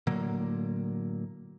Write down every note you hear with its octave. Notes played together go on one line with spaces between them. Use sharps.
A2 D3 F#3 A#3